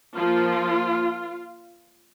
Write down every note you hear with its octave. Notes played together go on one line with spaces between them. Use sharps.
F3 A#3 F4